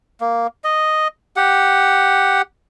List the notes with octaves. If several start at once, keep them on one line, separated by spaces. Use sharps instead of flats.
A#3
D#5
G4 F#5